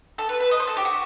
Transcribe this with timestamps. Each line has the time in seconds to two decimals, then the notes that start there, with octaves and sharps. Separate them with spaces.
0.18 A4
0.29 B4
0.40 B4
0.51 D#5
0.60 C5
0.67 A4
0.77 G4
0.85 F#4